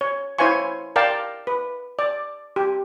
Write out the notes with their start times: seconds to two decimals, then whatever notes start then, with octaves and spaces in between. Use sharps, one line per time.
0.01 C#5
0.39 E4 C5 C#5 F5 G#5 C#6
0.96 A#4 D5 F5 G5 A5
1.47 B4
1.99 D5
2.56 G4